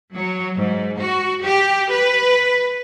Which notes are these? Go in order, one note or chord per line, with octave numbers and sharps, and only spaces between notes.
F#3
G#2
F#4
G4
B4